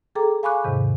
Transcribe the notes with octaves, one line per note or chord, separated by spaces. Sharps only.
G#4 A4 G5 A#5 D6
F5 G#5 B5 C#6 D6 F#6
E2 G#2 C3 D#3